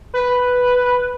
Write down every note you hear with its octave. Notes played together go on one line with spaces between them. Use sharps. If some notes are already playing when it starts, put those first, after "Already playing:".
B4